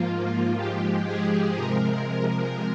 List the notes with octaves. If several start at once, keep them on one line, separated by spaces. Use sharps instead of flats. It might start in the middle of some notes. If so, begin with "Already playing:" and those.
Already playing: G#2 F3 A#3 F4
G#2 F3 G#3 G4
G#4
C3 F3 G#3 A#4